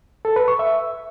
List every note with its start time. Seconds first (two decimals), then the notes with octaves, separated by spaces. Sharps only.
0.25 A4
0.36 B4
0.48 C#6
0.59 E5